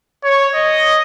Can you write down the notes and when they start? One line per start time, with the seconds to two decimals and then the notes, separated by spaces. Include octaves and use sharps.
0.24 C#5
0.54 D#5